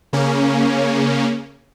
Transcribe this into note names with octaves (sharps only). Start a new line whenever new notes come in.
C#3 A#3 C#4